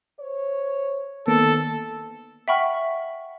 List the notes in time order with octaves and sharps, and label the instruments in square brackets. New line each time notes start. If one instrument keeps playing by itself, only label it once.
[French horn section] C5 C#5
[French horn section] D2 [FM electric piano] D#3 A#3 B3 [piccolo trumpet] A4
[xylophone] E5 F#5 G5 B5 C#6 F6